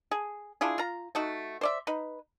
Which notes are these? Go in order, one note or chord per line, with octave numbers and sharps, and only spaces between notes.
G#4
D4 E4 F4 G#4
F4 A#5
A3 D#4 F#4
C5 D5 E5
D#4 B4